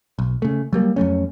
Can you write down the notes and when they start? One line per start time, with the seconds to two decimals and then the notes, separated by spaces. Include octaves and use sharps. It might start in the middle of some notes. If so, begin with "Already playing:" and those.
0.19 B1
0.42 C#3 A3
0.73 F#3 G3 A#3
0.96 F2 F#3 A3 C#4